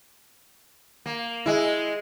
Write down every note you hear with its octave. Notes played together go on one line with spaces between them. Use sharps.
A#3
G#3 E4